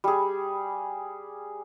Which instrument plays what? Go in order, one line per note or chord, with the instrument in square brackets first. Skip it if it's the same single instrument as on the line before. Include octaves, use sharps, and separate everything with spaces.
[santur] G3 G#4